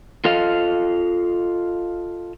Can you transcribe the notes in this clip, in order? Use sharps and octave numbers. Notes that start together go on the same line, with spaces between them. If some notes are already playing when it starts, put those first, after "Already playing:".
F4 A4 D#5 F5